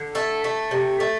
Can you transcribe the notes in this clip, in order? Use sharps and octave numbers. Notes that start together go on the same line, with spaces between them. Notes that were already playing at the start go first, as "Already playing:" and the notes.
Already playing: D3
A3 A4
A3
C3
A3